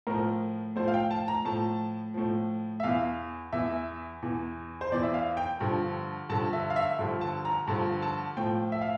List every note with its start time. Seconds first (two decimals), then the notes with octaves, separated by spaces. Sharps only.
0.07 A2 F3 A#4
0.76 A2 F3 C5
0.88 F5
0.94 G5
1.11 A5
1.28 A#5
1.45 A2 F3 A5
2.14 A2 F3
2.80 E5
2.83 E2 E3 F5
3.53 E2 E3 E5
4.22 E2 E3
4.81 C5
4.92 E2 E3 D5
5.03 E5
5.14 F5
5.37 G5
5.61 G2 D3 F3
6.29 G2 D3 F3 A5
6.53 E5
6.70 F5
6.76 E5
6.99 G2 D3 F3
7.21 A5
7.45 A#5
7.67 G2 D3 F3 A5
8.02 A5
8.37 A2 F3 G5
8.72 E5
8.81 F5